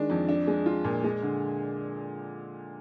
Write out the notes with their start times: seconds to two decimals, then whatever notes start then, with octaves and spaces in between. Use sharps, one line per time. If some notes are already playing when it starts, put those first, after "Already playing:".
Already playing: D#3 G#3 D4
0.10 F2
0.29 D4
0.47 G#3
0.66 F4
0.84 A#2
1.04 G#3
1.23 D3